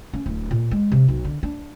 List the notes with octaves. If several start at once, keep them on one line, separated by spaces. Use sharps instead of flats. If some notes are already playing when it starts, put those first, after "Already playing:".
C#4
D1
A#2
G#3
C3
B1
D3
D4